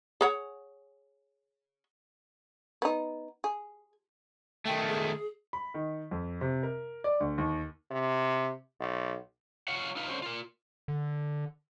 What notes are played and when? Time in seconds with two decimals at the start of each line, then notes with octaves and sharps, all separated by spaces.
0.21 G#4 C#5 F#5
2.82 B3 D#4
3.44 G#4
4.66 D#3 A3 G5
4.88 G#4
5.53 B5
5.74 D#3
6.11 F2
6.41 C3
6.63 A#4
7.04 D5
7.20 D2
7.38 D#2
7.91 C3
8.80 B1
9.68 F4 C#5 F5 F#5
9.96 D#4 F4 B4 F5
10.08 D3 C#4 F#4 C5
10.22 F4 A#4
10.88 D3